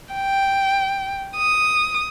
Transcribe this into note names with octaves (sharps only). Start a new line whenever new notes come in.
G5
D#6